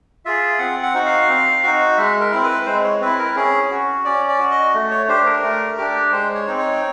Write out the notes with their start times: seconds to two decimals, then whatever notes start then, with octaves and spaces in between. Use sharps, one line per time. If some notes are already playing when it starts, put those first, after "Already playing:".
0.25 F4 G#4 E5
0.59 C4 F#5
0.83 F#5
0.94 D#4 F#4
1.06 F5
1.29 C4
1.64 D#4 F#4
1.98 G#3 E5
2.20 A#4
2.32 C4 E4
2.44 B4
2.66 G#3 C5
2.84 C#5
3.01 C4 E4 B4
3.19 A#4
3.36 C#4 G#4
3.71 F#4
4.05 C#4 D5
4.28 D5
4.39 F#4
4.51 D#5
4.75 A3
4.91 C#5
5.08 D4 G4 C5
5.26 A#4
5.43 A3
5.78 D4 G4
6.12 G#3 C5
6.35 C#5
6.47 C4 D#4
6.58 C#5